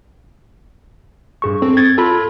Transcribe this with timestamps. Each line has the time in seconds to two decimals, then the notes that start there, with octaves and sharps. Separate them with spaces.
1.42 G2 G#4 C#6
1.62 C4 A4
1.77 G#6 A6
1.98 F4 A4 B5